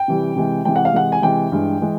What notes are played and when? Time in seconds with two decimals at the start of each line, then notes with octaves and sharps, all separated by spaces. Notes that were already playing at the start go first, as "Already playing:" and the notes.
Already playing: G5
0.08 C3 E3 G3
0.36 C3 E3 G#3
0.65 C3 E3 G#3 G5
0.76 F#5
0.85 F5
0.93 C3 E3 G#3 F#5
1.12 G#5
1.22 C3 E3 G#3 G5
1.52 G2 E3 G#3
1.81 E3 G#3